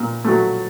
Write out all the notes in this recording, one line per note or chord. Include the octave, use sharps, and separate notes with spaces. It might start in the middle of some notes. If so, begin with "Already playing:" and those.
Already playing: A#2
F#3 A3